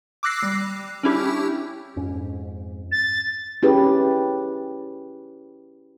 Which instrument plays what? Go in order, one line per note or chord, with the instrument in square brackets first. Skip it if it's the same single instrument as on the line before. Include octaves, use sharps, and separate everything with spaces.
[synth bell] D6 E6 F#6 A#6 C7
G3
C#4 D4 E4 G4
[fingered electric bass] F2 G#2 C#4
[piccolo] A6
[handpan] C#4 E4 G4 G#4 B4